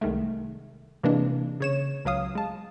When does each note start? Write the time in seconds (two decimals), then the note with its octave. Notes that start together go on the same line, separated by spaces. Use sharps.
0.01 C2 D#3 G#3 A3
1.04 C3 E3 G#3 A#3 D4
1.60 C#3 C#5 E7
2.05 C#2 F#3 F5 D#6
2.35 G#3 A5